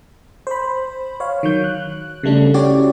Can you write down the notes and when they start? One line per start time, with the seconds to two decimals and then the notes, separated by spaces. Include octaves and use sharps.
0.47 C5 B5
1.20 C#5 F5
1.43 D#3 F#3 G6
1.64 F#6
2.23 C#3 G3 A3 D4
2.54 C#4 E4 F#4 G4 C#5 D5